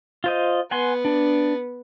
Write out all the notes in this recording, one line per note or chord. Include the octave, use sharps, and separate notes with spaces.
F4 C5 D#5
B3 F#5 G#5 C6
D4